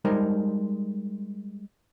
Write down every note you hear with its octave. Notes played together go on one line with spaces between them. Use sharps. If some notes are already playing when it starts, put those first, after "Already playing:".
G3 G#3 D#4 A#4 C5